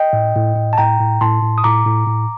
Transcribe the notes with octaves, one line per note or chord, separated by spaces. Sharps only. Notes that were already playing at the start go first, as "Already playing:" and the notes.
Already playing: D#5 G5
A2
A2
A2
A5
A2 G5 A#5
A2
A2 A5 C6
A2
D#6
A2 A#5 D6
A2
A2